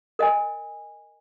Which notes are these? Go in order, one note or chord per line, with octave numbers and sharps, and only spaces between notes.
A#4 D#5 G#5